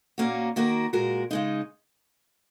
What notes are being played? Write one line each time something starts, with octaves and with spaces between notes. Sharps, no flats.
A#2 A#3 C#4 F#4
D#3 A#3 F#4 A#4
A#2 G#3 F#4 A#4
C#3 G#3 D#4